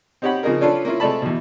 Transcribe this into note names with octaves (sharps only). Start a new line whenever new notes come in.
C4 D#4 G4 C#5 F#5 B5
C#3 F3 A#3 D#4 G#4 A#4
C#4 D4 F4 A4 B4 D5
A#3 C#4 E4 F4
C3 G#3 A3 D5 A5 B5
E2 B2